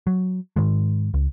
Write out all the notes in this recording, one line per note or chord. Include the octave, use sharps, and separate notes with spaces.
F#3
G#2 D#3 G#3
C#2